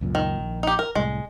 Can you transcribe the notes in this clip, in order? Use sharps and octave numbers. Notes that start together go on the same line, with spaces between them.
C#2 F#2 A#2
D#3
A#1
D#4 G4
A#4
C2 A2 G#3